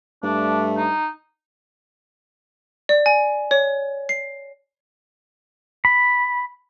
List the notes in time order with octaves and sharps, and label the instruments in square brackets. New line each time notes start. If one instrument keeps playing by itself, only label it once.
[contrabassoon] G2 [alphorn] A3 [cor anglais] D4
[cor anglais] D#4
[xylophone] D5
G#5
C#5
C7
[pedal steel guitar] B5